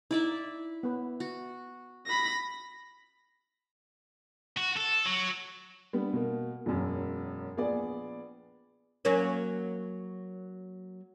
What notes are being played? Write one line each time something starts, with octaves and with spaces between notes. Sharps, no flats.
D#4 E4 D5 E5
B3 B4
F#4
B5 A#6
F#4
A4
F#3
G3 B3 D4
B2 A#3
E1 F#2
A#1 B3 G#4 D5
F#3 A#3 C#4